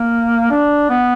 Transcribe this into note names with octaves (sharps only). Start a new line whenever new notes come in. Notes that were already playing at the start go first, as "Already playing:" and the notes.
Already playing: A#3
D4
B3